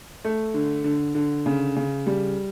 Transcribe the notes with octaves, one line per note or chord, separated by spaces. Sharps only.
A3
D3
D3
D3
C#3
C#3
G3